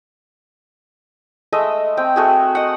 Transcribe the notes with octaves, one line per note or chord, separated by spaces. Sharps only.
G#3 A3 D#5 E5
C4 G5
A3 F#4 G#4
D#5 F#5